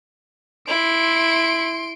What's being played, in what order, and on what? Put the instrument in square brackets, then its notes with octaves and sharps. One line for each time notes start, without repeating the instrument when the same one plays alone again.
[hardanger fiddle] E4 [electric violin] C6 D7